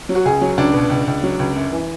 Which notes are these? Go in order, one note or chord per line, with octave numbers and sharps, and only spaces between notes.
F#3
F#4
C#2 G#4
F#3
C#2 D4
B2
C#2
C#2
F#3
C#2
F#2
E3